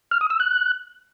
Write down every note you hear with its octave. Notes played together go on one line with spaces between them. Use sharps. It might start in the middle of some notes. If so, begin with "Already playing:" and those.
F6
D#6
E6
F#6